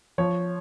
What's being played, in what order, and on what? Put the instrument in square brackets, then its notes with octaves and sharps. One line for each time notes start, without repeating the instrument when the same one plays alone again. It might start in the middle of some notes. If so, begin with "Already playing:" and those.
[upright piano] F3 [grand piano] C#5